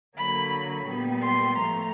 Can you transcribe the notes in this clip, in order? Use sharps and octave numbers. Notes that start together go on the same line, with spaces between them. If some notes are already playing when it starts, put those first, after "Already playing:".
D3 F#3 A#3 B5
A#2 G3 B3
C6
A2 F3 A3 A#5